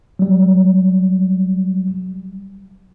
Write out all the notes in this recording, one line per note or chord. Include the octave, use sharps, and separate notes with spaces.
F#3 G3